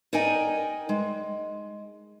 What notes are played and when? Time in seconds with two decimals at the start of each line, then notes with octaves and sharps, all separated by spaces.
0.13 D#4 A#4 D5 D#5 G5 G#5
0.89 G#3